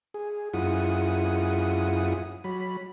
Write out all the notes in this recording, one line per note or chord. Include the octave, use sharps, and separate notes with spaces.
G#4
F#2 E4 F4 G#4 F#5 D#6
F#3 B5